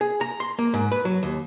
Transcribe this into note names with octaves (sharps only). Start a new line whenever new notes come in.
G#4
A#5
C6
A#3
G#2
B4
F#3
D#2